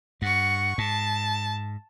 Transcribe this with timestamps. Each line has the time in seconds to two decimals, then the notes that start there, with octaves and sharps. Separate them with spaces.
0.22 G2 F#5 C#6
0.78 G#2 A5